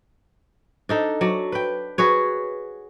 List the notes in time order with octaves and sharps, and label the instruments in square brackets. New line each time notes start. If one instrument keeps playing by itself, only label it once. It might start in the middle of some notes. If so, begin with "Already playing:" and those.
[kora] D4 D#4 A4
F#3 D5
B4 G5
F#4 G#4 B4 C#5